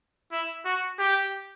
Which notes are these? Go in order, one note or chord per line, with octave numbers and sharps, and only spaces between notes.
E4
F#4
G4